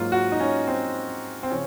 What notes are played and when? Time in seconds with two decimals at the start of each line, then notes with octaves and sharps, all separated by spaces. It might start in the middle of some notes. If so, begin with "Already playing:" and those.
Already playing: G#2 F#3 A#3 F4
0.12 F#4
0.32 D#4
0.40 C#4
0.67 C4
1.43 C4
1.50 C#3 F3 C#4